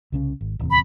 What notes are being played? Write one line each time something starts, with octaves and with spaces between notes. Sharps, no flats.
C2 C#3 C#4
G#1
D1 E2 C3
B5